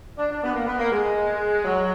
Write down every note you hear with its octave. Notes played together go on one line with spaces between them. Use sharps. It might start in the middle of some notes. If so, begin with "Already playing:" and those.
D4
D4
B3
A#3
B3
A#3
G#3
F#3